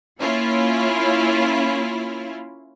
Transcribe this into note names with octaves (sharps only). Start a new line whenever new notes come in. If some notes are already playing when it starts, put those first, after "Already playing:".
A#3 C#4 E4 F4